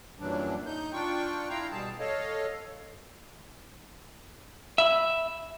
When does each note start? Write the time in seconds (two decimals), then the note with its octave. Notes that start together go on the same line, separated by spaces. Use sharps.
0.19 F#2 A#2 E3 F#3 G3 D4
0.66 D#4 G6
0.93 D4 F4 G5 C#6
1.49 E4 F5 G5 A#5
1.72 B2 G3 G#4 A5
1.99 A4 C#5 D#5 F5
4.78 E5 B5